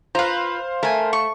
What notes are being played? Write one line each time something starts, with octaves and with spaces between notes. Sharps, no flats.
F4 B4 C5 F5 A#5
A3 A#4 G#5
C#6